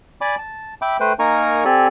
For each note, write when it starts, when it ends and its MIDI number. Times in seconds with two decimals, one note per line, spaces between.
0.21 0.35 74
0.21 0.35 80
0.21 0.35 83
0.21 0.35 86
0.38 0.74 81
0.82 0.97 76
0.82 0.97 79
0.82 0.97 83
0.82 0.97 86
1.00 1.13 57
1.00 1.13 71
1.00 1.13 72
1.00 1.13 79
1.19 1.64 58
1.19 1.64 63
1.19 1.64 70
1.19 1.64 80
1.19 1.64 82
1.19 1.64 85
1.65 1.87 60
1.65 1.87 67
1.65 1.87 69
1.65 1.87 74
1.65 1.87 80